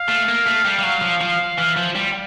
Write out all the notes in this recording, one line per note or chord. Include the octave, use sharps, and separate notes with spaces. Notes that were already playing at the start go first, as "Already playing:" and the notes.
Already playing: F5
A3
A#3
A3
G3
G3
F#3
F3
F3
E3
F3
G3